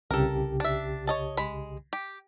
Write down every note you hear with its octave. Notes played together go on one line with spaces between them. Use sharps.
C2 C#3 G4 A4 A#4
D4 E5
C#5 D#5 A5
G#3 B5
G4